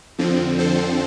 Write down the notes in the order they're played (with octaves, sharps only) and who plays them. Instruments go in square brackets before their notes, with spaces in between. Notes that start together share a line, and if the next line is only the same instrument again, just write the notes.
[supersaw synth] F2 D3 F3 C4
A4 C5